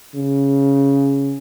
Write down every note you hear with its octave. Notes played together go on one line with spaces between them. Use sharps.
C#3